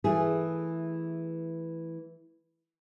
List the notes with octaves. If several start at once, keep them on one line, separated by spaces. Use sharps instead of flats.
E3 A3 G#4